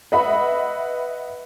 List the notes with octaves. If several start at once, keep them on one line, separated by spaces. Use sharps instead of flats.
B4 D#5 E5 F#5 B5